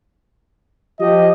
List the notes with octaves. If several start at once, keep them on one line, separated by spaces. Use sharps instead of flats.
F3 G4 D#5